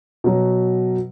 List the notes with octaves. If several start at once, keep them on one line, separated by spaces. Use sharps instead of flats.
B2 F#3